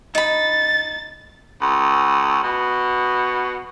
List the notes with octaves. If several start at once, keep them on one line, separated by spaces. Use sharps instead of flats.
D#4 B5 A6
C#2
B2